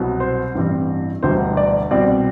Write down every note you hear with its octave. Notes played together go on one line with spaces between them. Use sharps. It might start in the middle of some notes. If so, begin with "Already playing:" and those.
Already playing: C2 B2 F#3 B3
C5
A1 G2 E3 G3 C4
E1 D2 D3 G3 C5
D5
C2 B2 G3 C4 D5